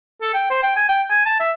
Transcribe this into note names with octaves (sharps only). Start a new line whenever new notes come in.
A4
G5
C5
G5
G#5
G5
G#5
A5
E5